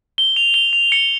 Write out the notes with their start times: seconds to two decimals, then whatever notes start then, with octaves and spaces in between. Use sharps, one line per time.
0.18 G7
0.36 F7
0.54 G7
0.73 F7
0.92 C#7